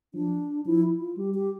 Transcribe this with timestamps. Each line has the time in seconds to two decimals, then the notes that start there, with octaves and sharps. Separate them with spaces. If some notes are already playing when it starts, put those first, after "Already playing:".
0.14 F3 D4
0.66 F3 E4
1.00 F4
1.17 G3 G4
1.34 G4